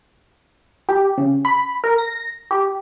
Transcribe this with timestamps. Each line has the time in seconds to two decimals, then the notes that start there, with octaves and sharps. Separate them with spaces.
0.89 G4
1.18 C#3
1.45 B5
1.84 A#4
1.98 A#6
2.51 G4